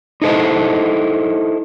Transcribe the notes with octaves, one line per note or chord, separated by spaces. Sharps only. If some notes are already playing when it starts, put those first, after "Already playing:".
D#4 E4 A4 C5 D#5